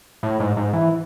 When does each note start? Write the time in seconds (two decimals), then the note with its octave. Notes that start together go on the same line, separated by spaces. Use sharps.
0.23 A2
0.40 G#2
0.57 G#2
0.73 E3